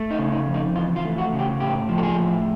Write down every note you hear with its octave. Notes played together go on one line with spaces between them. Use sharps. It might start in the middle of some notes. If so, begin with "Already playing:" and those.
Already playing: A3
D#4
C#3
D#4
F2
D#4
E3 F4
F4
A3
F#4
C#3
G4
A2 G4
F3
A4
G#4
A2